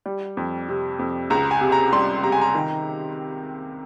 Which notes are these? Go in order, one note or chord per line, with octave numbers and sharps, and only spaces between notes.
G3
F2
C3
F2
C#2 A#5
G#5
C3
A#5
G3 C6
C3 A#5
G#5
A#5
D#3